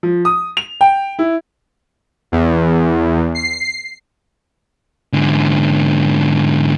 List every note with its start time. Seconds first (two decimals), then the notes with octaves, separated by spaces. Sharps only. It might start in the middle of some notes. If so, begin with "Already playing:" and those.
0.03 F3
0.25 D#6
0.57 F7
0.81 G5
1.19 E4
2.32 E2
3.35 C7
5.13 G#2 D3